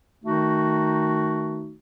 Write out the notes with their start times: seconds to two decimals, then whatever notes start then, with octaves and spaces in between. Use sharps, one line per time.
0.23 D#3 A3 D#4 F#4